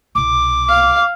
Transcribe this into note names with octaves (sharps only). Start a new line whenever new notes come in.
C2 B2 D6
F5